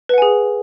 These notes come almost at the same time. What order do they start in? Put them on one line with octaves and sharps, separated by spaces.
B4 F#5 G#5 G#4